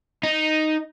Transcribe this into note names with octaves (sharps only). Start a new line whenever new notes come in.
D#4